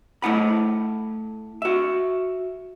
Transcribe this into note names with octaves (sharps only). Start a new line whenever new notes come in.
A3 E4 F#5 B5
F#4 E5